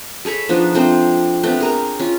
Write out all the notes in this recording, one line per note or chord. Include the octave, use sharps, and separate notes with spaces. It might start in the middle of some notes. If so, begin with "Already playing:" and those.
G#4 A4 C#5 B5
F3 B3 D4 D#4
A3 C4 D4 C5
A3 B3 C4 D4
G#4 A#4 A#5
C#4 F4